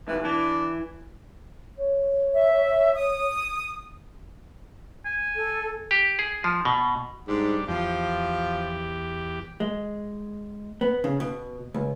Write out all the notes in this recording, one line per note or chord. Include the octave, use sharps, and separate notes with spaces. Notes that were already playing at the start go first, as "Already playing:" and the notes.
C#2 G#2 E3
E3 D4
C#5
E5
D#6
G#5
A4
G4
G#4
F3
B2
G#2 G3 D4
E2 F3 G4
G#3
B3
C#3
B2
C#2